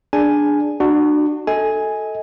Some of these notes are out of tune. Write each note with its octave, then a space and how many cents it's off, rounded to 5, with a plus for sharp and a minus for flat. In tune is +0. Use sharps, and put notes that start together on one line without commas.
D4 +0 G#4 +0 G#5 +0
D4 +30 F#4 +0
A4 +0 D#5 +35 G#5 +0